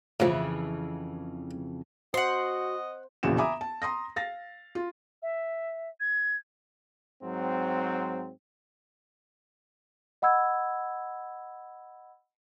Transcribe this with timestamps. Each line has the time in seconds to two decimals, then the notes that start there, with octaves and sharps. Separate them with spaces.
0.20 F2 A2 C#3 E3 F3
2.14 F#4 C5 D#5 F#5 C6
3.23 E1 A#1 C#3 E3 F#4 E7
3.38 E5 G#5 A#5 B5 D6 D#6
3.61 A5
3.82 A#5 C6 D#6 A#6
4.16 F5 A6 A#6
4.75 F4
5.22 E5
6.00 G#6
7.23 G#2 F#3 C4
10.22 D#5 F#5 B5 E6 G#6